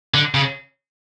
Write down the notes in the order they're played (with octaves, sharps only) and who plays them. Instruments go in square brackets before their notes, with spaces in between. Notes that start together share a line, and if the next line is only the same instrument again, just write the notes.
[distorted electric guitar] D3
C#3